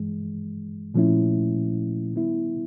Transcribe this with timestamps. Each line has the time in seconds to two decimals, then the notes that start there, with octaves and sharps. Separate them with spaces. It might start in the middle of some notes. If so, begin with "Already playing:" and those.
Already playing: G2 E3 G#3
0.94 A#2 F3 A3 C#4 E4
2.13 D#3 G3 B3 E4